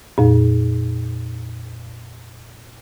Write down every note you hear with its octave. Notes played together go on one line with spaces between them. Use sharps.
F2 A#2